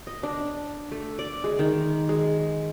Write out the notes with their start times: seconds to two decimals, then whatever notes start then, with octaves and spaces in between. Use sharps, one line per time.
0.07 D#5
0.23 D4
0.92 A3
1.19 D5
1.44 G#3
1.59 D#3
2.09 G#3